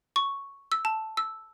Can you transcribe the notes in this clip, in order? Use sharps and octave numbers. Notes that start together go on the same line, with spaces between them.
C#6
E6
A5
E6